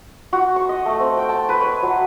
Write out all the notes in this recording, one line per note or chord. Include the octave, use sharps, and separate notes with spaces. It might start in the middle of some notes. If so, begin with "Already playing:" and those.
F#4
C#6
D#5
A3
C4
G5
A5
B4
C#5
F#3